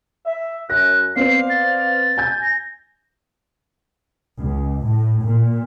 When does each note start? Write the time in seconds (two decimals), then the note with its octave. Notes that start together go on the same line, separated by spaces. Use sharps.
0.25 E5
0.70 F#2 F#6 A#6
1.16 B3 C4 C5 D5 F5 C7
1.50 A6
2.18 G#5 G6 G#6
2.42 A#6
4.39 C#2
4.85 A2
5.26 A#2